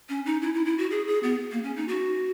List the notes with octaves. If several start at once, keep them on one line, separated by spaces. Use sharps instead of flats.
C#4
D#4
E4
E4
E4
F#4
G#4
G#4
B3
A#3
C#4
D#4
F#4